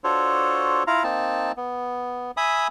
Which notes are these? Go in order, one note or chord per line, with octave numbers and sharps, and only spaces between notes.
D4 F4 F#4 A4 C5 C#5
E4 F4 F5 A#5
A#3 C4 D#4 A5
B3
E5 G#5 B5 D#6